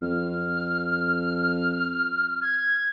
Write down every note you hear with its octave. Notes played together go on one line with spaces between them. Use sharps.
F2 F6
G#6